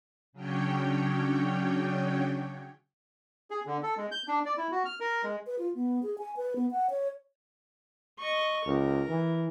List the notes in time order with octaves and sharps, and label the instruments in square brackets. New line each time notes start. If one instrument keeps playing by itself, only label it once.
[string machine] C#3 F#3 C#4 D4 C#5 G5
[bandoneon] G#4
D3
A4
G#3
G6
D4
D5
E4
F#4
F6
A#4
G#3
[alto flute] B4
F4
B3
G#4
G#5
B4
B3
F#5
C#5
[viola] D#5 C#6
[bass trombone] C#2 [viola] A#4
[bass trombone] E3